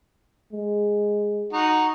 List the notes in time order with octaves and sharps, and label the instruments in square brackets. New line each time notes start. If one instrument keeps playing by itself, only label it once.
[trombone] G#3
[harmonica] D#4 F#4